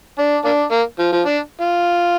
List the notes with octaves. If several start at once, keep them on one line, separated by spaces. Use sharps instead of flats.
D4
A#3 D4
A#3
F3
F3
D4
F4